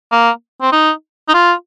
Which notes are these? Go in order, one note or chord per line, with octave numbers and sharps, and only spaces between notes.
A#3
C4
D#4
D#4
F4